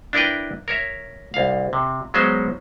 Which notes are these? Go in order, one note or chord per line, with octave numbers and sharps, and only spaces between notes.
D4 E4 A#4 B4 G5
A#4 C#5 E5
C2 F5
C3
F#3 G#3 B3 C#4 C5 D#5